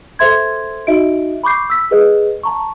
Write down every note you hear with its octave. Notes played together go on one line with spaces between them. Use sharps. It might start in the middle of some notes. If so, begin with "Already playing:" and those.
A4 C5 E5 C6 G#6
D#4 F#4 D#5 E5 D7
B5 C#6 D6 G6 C7
E6 B6
G#4 B4 D#5
A5 A#5 C#6